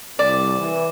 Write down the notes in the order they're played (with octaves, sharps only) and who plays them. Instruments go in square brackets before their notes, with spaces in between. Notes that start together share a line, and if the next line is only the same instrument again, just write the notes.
[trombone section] C2 [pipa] D5 [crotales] D6
[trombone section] E3